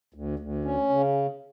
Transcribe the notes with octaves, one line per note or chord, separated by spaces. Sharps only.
D2
D2
C#4
C#3